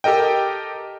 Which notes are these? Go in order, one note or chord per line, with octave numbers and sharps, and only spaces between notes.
G4 A4 A#4 D#5 G5